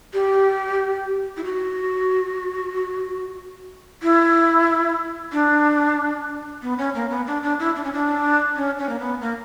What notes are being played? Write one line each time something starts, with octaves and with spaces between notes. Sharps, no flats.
G4
E4
F#4
E4
D4
B3
C#4
A#3
B3
D4
D4
E4
D4
C#4
D4
C#4
C#4
A#3
B3
A#3